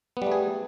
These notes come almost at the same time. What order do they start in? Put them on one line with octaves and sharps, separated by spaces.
B3 G3 A3 G#4